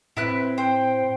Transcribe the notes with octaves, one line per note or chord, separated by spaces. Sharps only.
A2 C4 E4 B4 F#6
C5 G5